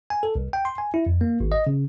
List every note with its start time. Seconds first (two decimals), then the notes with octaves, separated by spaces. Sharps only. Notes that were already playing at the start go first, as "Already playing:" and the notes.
0.10 G#5
0.23 A4
0.36 C2
0.53 G5
0.65 C6
0.78 G#5
0.94 E4
1.06 F2
1.21 A#3
1.40 G#1
1.52 D#5
1.67 C#3